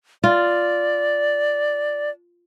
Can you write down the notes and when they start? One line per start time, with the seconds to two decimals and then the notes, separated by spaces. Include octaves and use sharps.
0.24 F4 D5